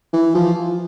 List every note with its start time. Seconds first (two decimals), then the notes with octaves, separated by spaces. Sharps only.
0.13 E3
0.35 F3